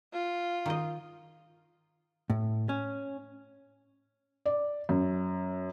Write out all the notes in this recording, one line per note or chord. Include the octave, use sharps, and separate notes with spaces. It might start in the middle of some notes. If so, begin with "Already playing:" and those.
F4
D#3 C5 D#5
A2
C#4
D5
F#2